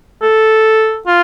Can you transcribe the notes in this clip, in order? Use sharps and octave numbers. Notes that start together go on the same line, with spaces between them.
A4
F4